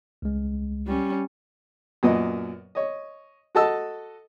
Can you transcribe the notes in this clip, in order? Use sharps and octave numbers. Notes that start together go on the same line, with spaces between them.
C#2 G#3
G3 C#4
F#2 A#2 B3 B4 D#5
C#5 D#5
F#4 A4 D#5 A5 E6